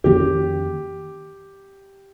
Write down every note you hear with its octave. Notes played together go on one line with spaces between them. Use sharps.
F2 D#3 A#3 C#4 G4